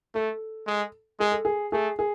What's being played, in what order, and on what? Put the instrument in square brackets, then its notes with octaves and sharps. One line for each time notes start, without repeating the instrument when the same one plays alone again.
[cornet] A3 [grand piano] A4
[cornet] G#3
[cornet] G#3 [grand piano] G#4
[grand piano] A4
G#4
[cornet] A3 [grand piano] G#4
[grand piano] G#4